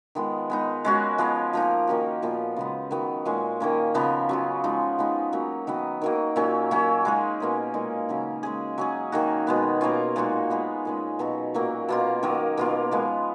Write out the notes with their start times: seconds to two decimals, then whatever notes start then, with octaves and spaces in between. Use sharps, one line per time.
0.15 D#3 G#3 B3 F4
0.50 G#3 B3 D#4
0.85 G#3 C#4 F#4
1.18 F3 G#3 B3
1.53 F3 A#3 D#4
1.87 D#3 A#3 C#4 F#4
2.22 A#2 F3 B3
2.57 C#3 G#3 B3
2.91 D#3 F#3 B3
3.25 A#2 G#3 C#4
3.60 D#3 A#3 C#4
3.94 C#3 F3 B3
4.29 F#3 C#4 F4
4.64 F3 G#3 D#4 G#4
4.98 F3 G#3 B3 D#4
5.33 F#3 A#3 C#4
5.67 D#3 F#3 B3
6.02 D#3 F#3 A#3
6.36 A#2 F#3 C#4
6.71 F#3 A#3 C#4
7.05 G#3 D#4 G#4
7.40 B2 A#3 C#4
7.74 A#2 G#3 D#4
8.09 C#3 F#3 C#4
8.43 G#3 C#4 G#4
8.78 F#3 C#4 G#4
9.12 D#3 A#3 D#4 F#4
9.47 B2 G#3 B3
9.81 B2 A#3 C#4 F4
10.16 A#2 G#3 D#4 F#4
10.50 G#3 B3 F4 G#4
10.85 A#2 G#3 C#4
11.19 B2 F#3 C#4 F#4
11.54 A#2 F#3 A#3
11.89 B2 A#3 F4
12.23 D#3 F#3 A#3
12.57 B2 A#3 F4
12.91 F3 G#3 B3